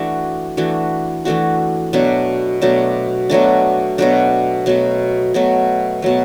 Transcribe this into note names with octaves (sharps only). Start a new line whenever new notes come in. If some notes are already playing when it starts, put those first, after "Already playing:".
Already playing: E3 A3 D4 F#4
E3 A3 D4 F#4
E3 A3 D4 F#4
B2 F#3 A3 D4
B2 F#3 A3 D4
B2 F#3 A3 D4
B2 F#3 A3 D4
B2 F#3 A3
B2 F#3 A3
B2 F#3 A3